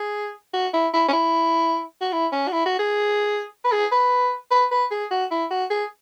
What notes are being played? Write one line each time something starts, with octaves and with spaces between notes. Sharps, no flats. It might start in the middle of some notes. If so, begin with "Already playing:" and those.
Already playing: G#4
F#4
E4
E4
C#4
E4
F#4
E4
C#4
F#4
E4
F#4
G#4
B4
G#4
B4
B4
B4
G#4
F#4
E4
F#4
G#4